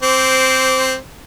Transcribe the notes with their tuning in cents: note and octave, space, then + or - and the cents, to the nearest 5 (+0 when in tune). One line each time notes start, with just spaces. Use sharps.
C4 +0 C5 -10 D6 -20